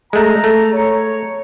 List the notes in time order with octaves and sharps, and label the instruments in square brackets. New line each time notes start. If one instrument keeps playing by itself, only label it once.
[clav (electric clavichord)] G#3 A3 [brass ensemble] A#5
[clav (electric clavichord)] A3
[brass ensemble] C#5